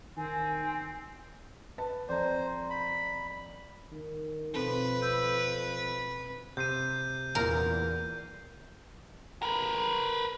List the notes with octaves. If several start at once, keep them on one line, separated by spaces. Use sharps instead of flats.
D#3 C4 G#5
B4 A5
F2 C5 D5 A#5
B5
D#3
F2 B2 C4 A4 B4
B5 E6 G6
C3 G6 C7 D#7
E2 A#2 A#4
A#4 B4